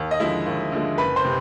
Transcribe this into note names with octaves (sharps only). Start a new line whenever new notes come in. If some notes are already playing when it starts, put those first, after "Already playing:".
Already playing: D#2
D#5
D3 F3 G#3 E4 E5
D#2
D3 F3 G#3
F#1 B4 B5
C5 C6
C3